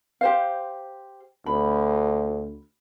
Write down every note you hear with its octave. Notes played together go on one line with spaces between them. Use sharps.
G4 C5 F5
D2 B5